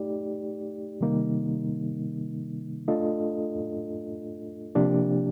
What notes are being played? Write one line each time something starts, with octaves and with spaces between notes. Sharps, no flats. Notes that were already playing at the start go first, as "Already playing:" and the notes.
Already playing: A3 D#4 G4 D5
C3 D#3 G3 A#3 D#4
A3 D4 F4 A4 D#5
C3 F3 A#3 D4 G4